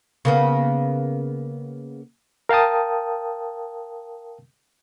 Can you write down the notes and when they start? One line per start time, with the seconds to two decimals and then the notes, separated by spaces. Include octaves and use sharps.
0.25 C#3 A#3 B3
2.49 A#4 F5 G5 A5 D#6